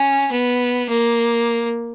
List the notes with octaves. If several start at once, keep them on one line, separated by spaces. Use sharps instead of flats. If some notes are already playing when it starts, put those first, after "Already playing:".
Already playing: C#4
B3
A#3